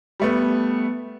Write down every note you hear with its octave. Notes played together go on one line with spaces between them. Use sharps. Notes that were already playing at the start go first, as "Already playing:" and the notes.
G3 A3 B3